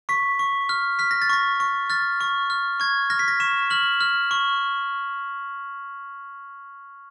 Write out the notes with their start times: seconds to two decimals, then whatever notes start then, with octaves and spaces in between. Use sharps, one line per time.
0.09 C#6 B6
0.39 C#6
0.69 F6
0.99 F6 B6
1.11 A#6
1.22 A6
1.30 C#6 A#6
1.60 C#6
1.90 F6 A6
2.21 C#6
2.50 F6
2.80 C#6 G#6
3.10 F6 A#6
3.19 B6
3.28 A#6
3.40 C#6 E7
3.70 F6 F#7
4.01 F6
4.31 C#6